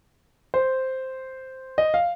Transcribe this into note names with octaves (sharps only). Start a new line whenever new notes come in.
C5
D#5
F5